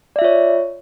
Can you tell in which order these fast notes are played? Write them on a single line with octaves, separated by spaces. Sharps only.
D5 E5 F4 C#5